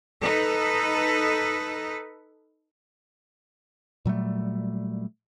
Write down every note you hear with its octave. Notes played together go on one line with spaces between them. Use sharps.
D#4 A4 B4
A#2 F#3 G3 A3